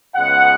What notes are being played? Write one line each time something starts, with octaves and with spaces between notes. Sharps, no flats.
C#2 C#3 G#3 B3 F#5